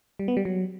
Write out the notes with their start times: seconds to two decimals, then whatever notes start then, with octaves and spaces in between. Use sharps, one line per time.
0.19 G3
0.28 B3
0.37 G3
0.45 F#3